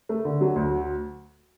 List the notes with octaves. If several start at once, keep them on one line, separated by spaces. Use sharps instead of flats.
A3
D3
F#3
D2